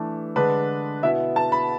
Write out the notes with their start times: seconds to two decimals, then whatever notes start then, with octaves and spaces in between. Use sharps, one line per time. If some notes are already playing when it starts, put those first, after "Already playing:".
Already playing: E3 A3 D4
0.36 D3 G#3 D4 B4
1.02 B2 B3 E4 E5
1.36 A5
1.52 B5